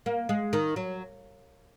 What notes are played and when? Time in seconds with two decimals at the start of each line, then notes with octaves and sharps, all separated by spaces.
0.06 A#3
0.29 G#3
0.53 D#3
0.76 F#3